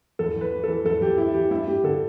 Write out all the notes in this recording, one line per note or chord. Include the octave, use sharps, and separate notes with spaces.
E2 A4
E2
B4
E3
A4
E3
E2 A4
E2 G4
E3 E4
E3 G4
G2 E4
G2 G4
D3 A4